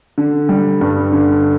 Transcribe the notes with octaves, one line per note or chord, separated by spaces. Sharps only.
D3
G3
G2
D3